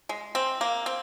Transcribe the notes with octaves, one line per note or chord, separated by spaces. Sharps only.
G#3
C4
A#3
C4